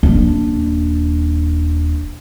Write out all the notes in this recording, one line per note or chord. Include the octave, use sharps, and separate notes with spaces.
D#1 D4